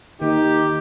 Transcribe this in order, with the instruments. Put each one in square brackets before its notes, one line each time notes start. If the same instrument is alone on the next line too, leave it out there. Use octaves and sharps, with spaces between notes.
[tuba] D#2 [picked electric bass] D#3 [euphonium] D#4 [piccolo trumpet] G4